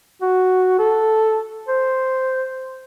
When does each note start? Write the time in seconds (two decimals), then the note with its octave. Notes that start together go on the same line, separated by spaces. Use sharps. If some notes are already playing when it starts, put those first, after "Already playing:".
0.22 F#4
0.79 A4
1.68 C5